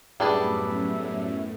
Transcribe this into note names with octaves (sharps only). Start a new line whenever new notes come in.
F#2 A2 G3 B3 D4 G#4 D5 E5